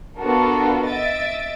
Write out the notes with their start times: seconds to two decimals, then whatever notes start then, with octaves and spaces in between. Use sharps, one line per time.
0.19 B3 D4 F4 F#4 A4 A#4
0.88 D#5 E5 A6 D7